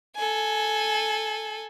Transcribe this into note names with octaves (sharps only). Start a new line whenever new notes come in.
A4 G#5